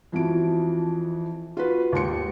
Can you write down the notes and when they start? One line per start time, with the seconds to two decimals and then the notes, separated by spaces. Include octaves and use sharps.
0.12 F2 E3 F3 F#4 D7
1.57 F4 F#4 B4
1.93 D#2 G#2 C6 C#7